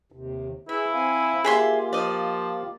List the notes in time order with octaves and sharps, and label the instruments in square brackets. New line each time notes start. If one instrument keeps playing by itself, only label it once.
[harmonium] D#2 C3
[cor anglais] E4 [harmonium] G#4 B4 [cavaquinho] E5
[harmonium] C4 F5 G#5
[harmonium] A#3 F4 G4 [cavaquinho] G#4 E5 C6
[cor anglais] F3 [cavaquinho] D5 D#5